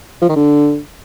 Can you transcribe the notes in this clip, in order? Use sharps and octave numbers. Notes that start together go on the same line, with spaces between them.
F3
D#3
D3